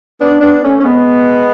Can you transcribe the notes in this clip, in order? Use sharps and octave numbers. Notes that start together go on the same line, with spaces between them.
B3 D4
B3 D4
A3 C#4
C#4
G#3 B3